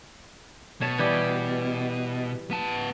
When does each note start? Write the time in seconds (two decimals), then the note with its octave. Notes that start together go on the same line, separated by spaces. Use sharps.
0.81 B2 C#5 A5
0.98 E3 G3 G4
2.51 B3 A5